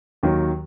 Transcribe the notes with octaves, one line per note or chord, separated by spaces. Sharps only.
D#2 D#3 F#3